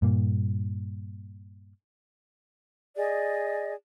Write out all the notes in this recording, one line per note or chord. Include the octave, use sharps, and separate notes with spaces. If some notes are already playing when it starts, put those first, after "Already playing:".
G2 A#2 A#3
G#4 D5 D#5